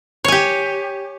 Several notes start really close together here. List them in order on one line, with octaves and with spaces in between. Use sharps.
C#5 G#5 G4